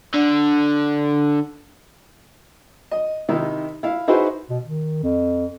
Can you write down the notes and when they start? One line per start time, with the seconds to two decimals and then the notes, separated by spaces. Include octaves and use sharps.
0.14 D3 D4
2.91 D#5
3.29 C3 D#3 D#4 E4
3.83 E4 F5
4.08 D#4 E4 F#4 G#4 B4 C5
4.50 B2
4.64 D#3
5.03 F2